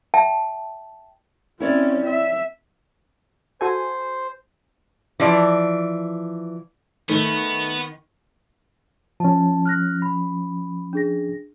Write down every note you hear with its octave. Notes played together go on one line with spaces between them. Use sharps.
E5 G5 A5
C4 C#4 E4 C#5 D5
E5
F#4 A4 C5 G#5
E3 F3 D5
D#3 A3 B3 E5
F3 C#4 A5
F6 F#6 A#6
B5
D4 G#4 A#6